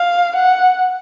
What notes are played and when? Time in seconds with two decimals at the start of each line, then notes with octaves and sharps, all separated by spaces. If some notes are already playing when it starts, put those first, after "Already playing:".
Already playing: F5
0.36 F#5